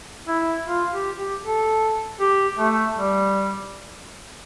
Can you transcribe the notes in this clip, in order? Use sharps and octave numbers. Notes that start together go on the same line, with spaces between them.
E4
F4
G4
G4
A4
G4
A3
G3